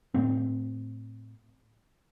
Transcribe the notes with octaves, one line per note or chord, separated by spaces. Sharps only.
A2 A3 C4